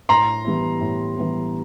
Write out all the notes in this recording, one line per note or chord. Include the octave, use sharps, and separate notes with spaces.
A2 A#5 C6
E3 G3 B3 E4
A2
E3 G3 B3 E4